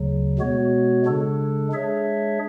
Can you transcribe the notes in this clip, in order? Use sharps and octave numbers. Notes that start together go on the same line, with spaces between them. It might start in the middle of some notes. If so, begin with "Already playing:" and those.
Already playing: D2 C#3 F#3
B2 G#3 B3 F#4 C#5
C#3 G#3 D4 A4
G#3 D4 G#4 C#5 E5